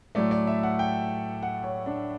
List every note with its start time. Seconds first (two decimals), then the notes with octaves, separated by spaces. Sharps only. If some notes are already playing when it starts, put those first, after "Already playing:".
0.15 A2 F#3 A3 D5
0.31 D5
0.47 E5
0.63 F#5
0.79 G5
1.43 F#5
1.64 C#5
1.86 D4